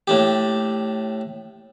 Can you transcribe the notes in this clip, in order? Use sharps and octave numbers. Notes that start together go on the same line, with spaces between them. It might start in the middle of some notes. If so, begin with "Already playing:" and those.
A2 D4 G4